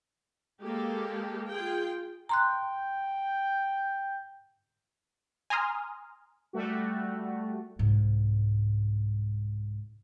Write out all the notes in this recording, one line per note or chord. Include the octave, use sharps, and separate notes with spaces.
G#3 A#3 G4 A4
F4 G#4 G5
G5 A#5 C6 F#6
G#5 A#5 C6 D#6 F6
G3 A3 F#4
C2 G#2